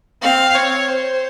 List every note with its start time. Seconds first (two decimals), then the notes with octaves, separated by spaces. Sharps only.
0.22 C4 F5
0.55 C#5
0.88 C5